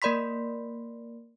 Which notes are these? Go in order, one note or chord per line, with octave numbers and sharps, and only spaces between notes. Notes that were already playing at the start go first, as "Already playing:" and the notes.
A#3 A#4 D5 B5 C6 B6